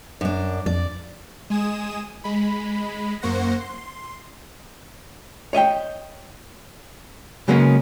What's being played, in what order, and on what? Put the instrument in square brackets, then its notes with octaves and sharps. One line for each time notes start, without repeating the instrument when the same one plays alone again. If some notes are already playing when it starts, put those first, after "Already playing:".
[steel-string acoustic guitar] F#2 D4
[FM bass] F2 [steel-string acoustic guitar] D5
[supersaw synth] G#3 G#5 D#6 E7
G#3 B5
F#2 A#3 C5 F#5 C#6 A#6
C6
[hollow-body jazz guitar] C#5 D#5 E5 G5
C#3 F#3 G#3 A#3 B3 C#4